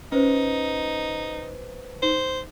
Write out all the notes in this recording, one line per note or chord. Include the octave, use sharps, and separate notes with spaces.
C#4 D#4 B4 C5
D#4 C5